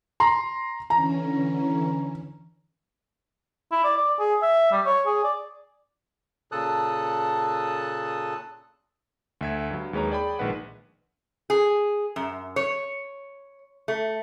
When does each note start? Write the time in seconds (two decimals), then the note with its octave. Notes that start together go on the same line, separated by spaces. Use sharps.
0.20 A#5 C6
0.90 D3 E3 C#4 A#5
3.72 E4
3.84 D5
3.97 D5
4.19 G#4
4.43 E5
4.72 G3
4.86 C#5
5.06 G#4
5.24 D5
6.52 A#2 C#3 A4 A5 D#6 F#6
9.41 D2 E5 G#6
9.71 G2 F#3
9.93 D#2 G#3 B4 C#5 A#5
10.10 G#4 D5 G5 B5
10.39 A#1 D#3 G#3 B4 F#5
11.50 G#4
12.16 F#2
12.56 C#5
13.88 A3